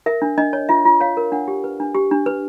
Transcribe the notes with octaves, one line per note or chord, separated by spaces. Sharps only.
A#4 E5
D4
D4 D#5
C#5
F4 E5
F4
C#5 F5
A#4
D4 F#5
G4
B4
D4
G4
D4
B4